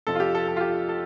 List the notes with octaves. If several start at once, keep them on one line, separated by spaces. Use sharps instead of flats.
F2 C3 F3 A4
F4
G4
A4
A4
F4
G4
A4